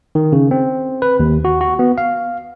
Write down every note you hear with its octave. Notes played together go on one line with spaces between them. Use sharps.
D#3
C#3
C4
B4
D#2
F#4
F#4
B3
F5